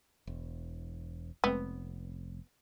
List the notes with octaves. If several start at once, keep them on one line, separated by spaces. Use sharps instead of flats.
E1
F1 G#3 A3 B3 C4